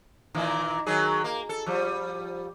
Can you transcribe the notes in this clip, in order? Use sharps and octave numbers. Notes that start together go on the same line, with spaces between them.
A#2 D#3 E3
D#3 F#3 G#4
A#3
A4
F3 G3